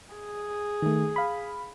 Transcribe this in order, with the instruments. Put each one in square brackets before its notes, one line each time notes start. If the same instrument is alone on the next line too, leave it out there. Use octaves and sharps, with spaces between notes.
[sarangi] G#4
[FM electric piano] D#3 A3
F5 B5